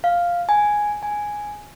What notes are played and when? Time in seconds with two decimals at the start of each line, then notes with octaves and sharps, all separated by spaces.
0.04 F5
0.49 G#5
1.03 G#5